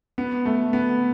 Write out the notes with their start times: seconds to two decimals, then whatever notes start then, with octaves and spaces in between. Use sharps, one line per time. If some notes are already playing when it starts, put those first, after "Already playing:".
0.18 B3
0.46 A3
0.73 B3